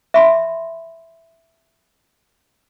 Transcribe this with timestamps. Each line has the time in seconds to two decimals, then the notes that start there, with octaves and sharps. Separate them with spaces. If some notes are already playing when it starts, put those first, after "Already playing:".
0.14 E5 B5 C6